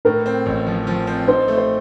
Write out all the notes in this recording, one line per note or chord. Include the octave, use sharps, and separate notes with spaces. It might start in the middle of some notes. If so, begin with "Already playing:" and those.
A2 A#4
C4
A1
F3
F3
C4
D#4 C5
A3
C5